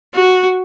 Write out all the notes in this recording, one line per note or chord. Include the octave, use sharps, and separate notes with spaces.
F#4